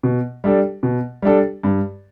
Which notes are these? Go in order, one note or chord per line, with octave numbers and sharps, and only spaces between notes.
B2
G3 D4 A4
B2
G3 D4 A4
G2